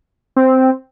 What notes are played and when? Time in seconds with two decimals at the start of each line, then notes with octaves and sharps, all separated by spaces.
0.36 C4